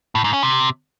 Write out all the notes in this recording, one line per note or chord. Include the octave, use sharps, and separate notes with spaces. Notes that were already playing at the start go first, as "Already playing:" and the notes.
A2
G#2
C#4
C3